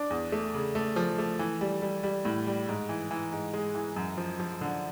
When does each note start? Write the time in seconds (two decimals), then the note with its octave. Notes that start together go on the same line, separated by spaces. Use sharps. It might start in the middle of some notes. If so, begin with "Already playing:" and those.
Already playing: D4
0.10 E2
0.32 A3
0.54 C#3
0.75 A3
0.96 F3
1.18 A3
1.39 E3
1.61 G3
1.82 G3
2.03 G3
2.25 A2
2.47 G3
2.68 G#2
2.89 E3
3.11 E3
3.32 G#2
3.53 G#3
3.75 E3
3.96 F#2
4.17 F3
4.40 F3
4.61 D3